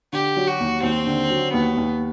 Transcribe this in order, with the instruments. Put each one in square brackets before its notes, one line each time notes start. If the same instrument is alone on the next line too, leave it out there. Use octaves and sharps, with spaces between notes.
[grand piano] D3 [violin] G4
[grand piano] F#3
[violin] F#4
[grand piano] D#2
[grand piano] D#2 [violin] C4
[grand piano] D3
F#3
[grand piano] D#2 [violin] B3
[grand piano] D#2